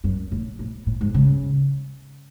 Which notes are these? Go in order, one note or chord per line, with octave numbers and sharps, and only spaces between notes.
F#2
A2
A2
A2
G#2
C#3